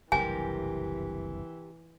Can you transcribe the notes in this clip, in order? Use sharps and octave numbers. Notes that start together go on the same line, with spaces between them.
F#1 C2 G2 C3 E3 G4 A#4 G#5